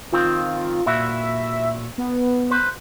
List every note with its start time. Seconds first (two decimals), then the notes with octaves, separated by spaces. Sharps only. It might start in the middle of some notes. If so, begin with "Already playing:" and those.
0.12 D#3 C4 F4
0.86 A#2 E4 F#4 E5
1.98 B3
2.50 B4 C5